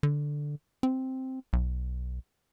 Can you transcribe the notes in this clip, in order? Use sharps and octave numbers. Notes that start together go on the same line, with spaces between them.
D3
C4
B1